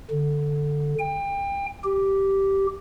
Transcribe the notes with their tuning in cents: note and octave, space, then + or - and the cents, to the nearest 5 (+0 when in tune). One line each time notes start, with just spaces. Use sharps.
D3 +0
G5 +30
G4 -10